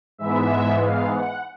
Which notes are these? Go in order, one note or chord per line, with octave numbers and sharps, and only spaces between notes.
G#2 E3 G#3 B3 E5
F5
F#5